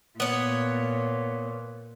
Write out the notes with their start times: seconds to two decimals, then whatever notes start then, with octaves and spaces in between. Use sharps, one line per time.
0.20 A#2 B3 C#5